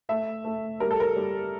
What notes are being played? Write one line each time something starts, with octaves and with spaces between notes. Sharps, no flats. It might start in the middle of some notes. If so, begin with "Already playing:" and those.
A3 E5
A3
G3 A#4
A4
A#4
G3